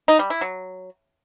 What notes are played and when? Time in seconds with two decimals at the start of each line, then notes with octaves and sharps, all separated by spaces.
0.08 D#4
0.19 G3
0.30 E4
0.41 F#3